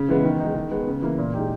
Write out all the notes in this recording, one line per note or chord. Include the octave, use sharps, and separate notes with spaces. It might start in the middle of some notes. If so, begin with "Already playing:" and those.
Already playing: C#3
E3 G#3 B3
D#3
G#3 D#4
D#3
G#3 B3
C#3
E3 A#3
A#2
G#3 D#4 G4